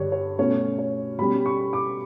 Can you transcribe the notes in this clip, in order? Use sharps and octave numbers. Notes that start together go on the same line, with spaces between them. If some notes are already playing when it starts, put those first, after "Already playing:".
Already playing: G2 D3 G3 C#5 D5
C#5
B2 A3 C#4 C#5
C#5
B2 G3 C#4 B5
C#6
D6